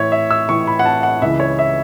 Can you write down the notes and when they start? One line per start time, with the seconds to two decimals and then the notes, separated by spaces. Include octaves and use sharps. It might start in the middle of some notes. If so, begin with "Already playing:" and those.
Already playing: A2 E3 C#5 E5
0.12 E5
0.31 E6
0.49 A2 E3 C#6
0.67 B5
0.79 F#5
0.86 A5
1.03 F#5
1.22 C#2 C#3 E3 E5
1.40 C#5
1.59 E5